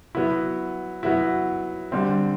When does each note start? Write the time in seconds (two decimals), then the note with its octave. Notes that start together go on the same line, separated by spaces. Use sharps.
0.15 F#3 B3 E4
1.03 F#3 B3 E4
1.92 D3 G3 C4